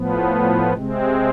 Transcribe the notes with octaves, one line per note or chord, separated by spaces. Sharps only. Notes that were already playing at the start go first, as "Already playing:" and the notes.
Already playing: A2 F3 B3
C3 G#3 C4